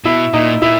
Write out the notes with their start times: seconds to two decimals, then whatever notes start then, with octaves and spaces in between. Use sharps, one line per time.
0.05 B2 E4
0.34 A#2 D#4
0.62 A#2 E4